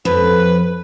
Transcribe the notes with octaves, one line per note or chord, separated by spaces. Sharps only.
F2 B4